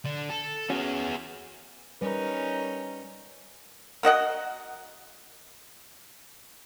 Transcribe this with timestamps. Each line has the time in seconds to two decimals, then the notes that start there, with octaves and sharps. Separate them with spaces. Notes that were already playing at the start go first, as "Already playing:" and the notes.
0.05 D3 D4
0.30 A4
0.70 B3 C#4 F#4 G#4
2.01 G3 C#4 D#4 A#4 B4
4.03 A#3 F#4 D#5 F#5